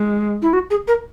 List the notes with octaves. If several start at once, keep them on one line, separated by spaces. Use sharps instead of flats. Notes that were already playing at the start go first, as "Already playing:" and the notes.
Already playing: G#3
E4
F#4
G#4
A#4